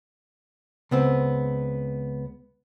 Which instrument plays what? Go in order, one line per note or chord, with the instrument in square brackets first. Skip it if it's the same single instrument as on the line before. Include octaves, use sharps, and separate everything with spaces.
[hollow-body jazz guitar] C#2 B3 C4